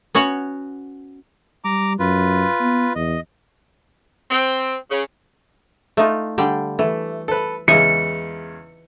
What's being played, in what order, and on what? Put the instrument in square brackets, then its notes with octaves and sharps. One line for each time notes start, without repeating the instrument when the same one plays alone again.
[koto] B3 C#4 F#4 C#5 F#5
[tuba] G3 [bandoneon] A#5 D6
[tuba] F#2 [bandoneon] F4 B4
[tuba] B3
[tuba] E2 [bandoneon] D#5
[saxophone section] C4
C#3
[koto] A3 D#4 F4
D3 G3 G5
[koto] E3 [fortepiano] A3
[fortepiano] A4 B4
[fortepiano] E2 C#3 G#3 [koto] E3 D#5 G#5 [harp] C#7